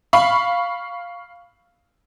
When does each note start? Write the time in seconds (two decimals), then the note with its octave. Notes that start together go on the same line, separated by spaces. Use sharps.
0.13 F5 B5 C#6